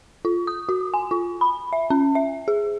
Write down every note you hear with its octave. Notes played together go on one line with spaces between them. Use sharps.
F4
D#6
F#4
G#5
F4
B5
E5
C#4
E5
G#4